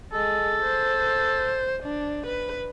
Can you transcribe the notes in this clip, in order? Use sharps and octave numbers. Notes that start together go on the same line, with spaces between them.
G#3 A4
C5
D4
B4